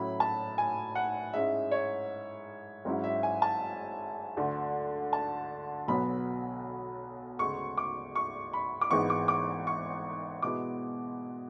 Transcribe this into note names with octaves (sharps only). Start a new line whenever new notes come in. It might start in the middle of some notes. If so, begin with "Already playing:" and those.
Already playing: A2 F#3 C#4 E4 B5
A5
G#5
F#5
G#2 G#3 C#4 E4 E5
C#5
G#1 G#2 F#3 C#4 E4
E5
G#5
A5
D2 D3 A3
A5
B1 B2 F#3 B3 B5
D2 C#3 G#3 C#6
D6
C#6
B5
D6
G#1 G#2 E3 G#3 B3 C#6
D6
D6
C#6
B2 G#3 B3 E4 D6